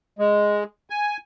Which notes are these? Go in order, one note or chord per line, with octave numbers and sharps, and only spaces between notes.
G#3
G#5